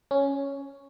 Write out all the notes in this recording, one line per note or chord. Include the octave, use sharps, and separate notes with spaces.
C#4